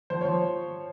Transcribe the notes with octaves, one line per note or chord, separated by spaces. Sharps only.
F3 C5
F3 C#5